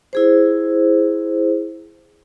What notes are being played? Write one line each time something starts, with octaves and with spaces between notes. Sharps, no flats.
E4 G#4 C5